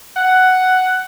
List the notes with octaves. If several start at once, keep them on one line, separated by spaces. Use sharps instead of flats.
F#5